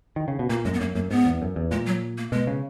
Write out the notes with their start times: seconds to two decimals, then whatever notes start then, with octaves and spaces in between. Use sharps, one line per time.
0.16 D#3
0.28 C#3
0.39 B2
0.49 A#2 A#3
0.65 F#2 G#3
0.73 B3
0.80 F#2 A#3
0.95 F#2 A#3
1.10 G#2 B3
1.25 E2
1.42 F#2
1.56 E2
1.71 A#2 G#3
1.86 F#3
2.18 A#3
2.32 B2 G#3
2.47 C#3